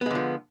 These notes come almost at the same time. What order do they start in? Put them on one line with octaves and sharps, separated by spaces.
B3 G#3 D3 F3